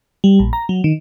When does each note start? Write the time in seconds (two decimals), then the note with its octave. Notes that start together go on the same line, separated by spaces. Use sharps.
0.24 G3
0.39 A#1
0.53 A#5
0.69 F#3
0.84 D#3